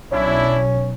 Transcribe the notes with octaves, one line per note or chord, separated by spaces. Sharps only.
B1 C#4 D4 E4